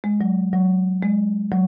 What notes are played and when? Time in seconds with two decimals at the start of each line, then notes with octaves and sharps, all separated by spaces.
0.04 G#3
0.21 F#3
0.53 F#3
1.03 G#3
1.52 F#3